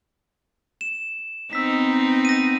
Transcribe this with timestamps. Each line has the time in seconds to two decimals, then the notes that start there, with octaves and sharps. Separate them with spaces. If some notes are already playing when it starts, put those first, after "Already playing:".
0.81 E7
1.53 B3 C4 D#4 E6 B6
2.25 A#6 D#7